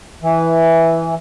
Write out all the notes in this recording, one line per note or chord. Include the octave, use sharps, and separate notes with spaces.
E3